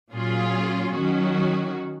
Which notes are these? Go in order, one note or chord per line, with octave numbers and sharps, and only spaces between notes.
A#2 F#3 C#4 F4 G#4
D#3 F#3 C#4 F#4